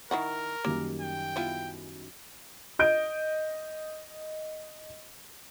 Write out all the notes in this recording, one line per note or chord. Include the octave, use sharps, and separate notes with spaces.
D#3 E4 A#4 F#5 A#5 C#6
F#2 D#3 G3 A#3
G5
B3 E4 F4
D#5 G6 D7